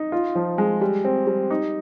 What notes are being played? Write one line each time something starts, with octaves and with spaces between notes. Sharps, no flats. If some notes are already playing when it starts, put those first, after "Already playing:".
Already playing: D#4
F4
F3
G#3
G3
C4
G3
D#4